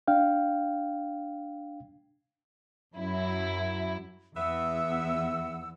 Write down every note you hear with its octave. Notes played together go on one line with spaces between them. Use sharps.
D4 F5 G5
F#2 E4
E2 B3 E5 F#5 E6